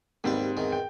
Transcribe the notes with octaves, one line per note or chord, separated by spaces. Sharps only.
D#2 G#2 G3 C4 B4
E2 D#3
G5